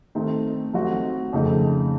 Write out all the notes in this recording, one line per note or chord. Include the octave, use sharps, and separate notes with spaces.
D#3 A3 C4 D#4
F#3 A3 C4 D#4 F#4
F2 C#3 A3 D#4